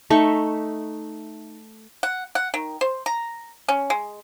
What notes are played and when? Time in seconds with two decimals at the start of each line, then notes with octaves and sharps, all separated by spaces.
0.10 A3 D#4 E5 C#6
2.03 F#5
2.35 F#5
2.54 D#3
2.81 C5
3.06 A#5
3.68 C#4
3.90 G#3